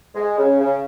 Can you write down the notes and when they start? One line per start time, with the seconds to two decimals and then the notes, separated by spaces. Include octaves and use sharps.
0.15 G#3
0.37 C#3
0.59 C#3